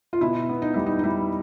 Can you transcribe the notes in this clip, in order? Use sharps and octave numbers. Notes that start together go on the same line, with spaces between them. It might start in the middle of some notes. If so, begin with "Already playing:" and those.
F4
B2 E4
B3
D#4
G3 E4
D#4
D#4
G3 E4